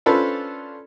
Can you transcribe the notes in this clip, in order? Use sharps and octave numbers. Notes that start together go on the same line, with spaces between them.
C#4 D4 F4 A4 B4 C5